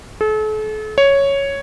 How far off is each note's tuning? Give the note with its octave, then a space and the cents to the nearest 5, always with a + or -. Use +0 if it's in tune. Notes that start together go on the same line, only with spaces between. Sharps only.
A4 -40
C#5 +0